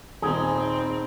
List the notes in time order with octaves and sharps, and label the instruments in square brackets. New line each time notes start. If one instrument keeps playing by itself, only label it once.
[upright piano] D#1 [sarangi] C4 [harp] D#4 [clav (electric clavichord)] G#4